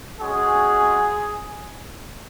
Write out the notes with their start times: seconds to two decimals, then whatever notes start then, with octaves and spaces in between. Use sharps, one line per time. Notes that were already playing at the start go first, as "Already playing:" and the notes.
0.21 G#3 C#4 F#4 G#4